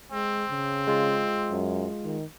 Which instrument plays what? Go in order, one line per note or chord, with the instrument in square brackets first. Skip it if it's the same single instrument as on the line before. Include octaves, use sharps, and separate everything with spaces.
[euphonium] G#3 [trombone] C4
[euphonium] C#3
[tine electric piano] G#3 F4
[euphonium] F#2
D#3